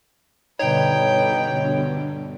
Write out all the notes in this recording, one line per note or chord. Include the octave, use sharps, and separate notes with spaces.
G2 B2 D3 D#4 B4 C#5 G5